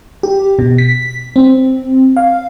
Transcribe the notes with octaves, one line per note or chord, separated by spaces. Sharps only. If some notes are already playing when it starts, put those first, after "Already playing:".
G4
B2
B6
C4
F5